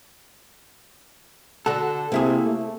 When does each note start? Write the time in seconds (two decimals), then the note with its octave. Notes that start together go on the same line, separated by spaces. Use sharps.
1.66 D3 F#4 A4
2.12 C3 A#3 E4 G#4
2.45 A3